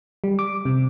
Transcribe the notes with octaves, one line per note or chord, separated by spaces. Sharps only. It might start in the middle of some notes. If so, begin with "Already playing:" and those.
G3
D6
C3